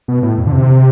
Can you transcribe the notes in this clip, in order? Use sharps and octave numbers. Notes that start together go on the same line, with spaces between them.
B2
A2
F2
D3
C3